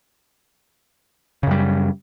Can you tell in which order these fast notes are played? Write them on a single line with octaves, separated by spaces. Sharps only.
C#3 F#2 G3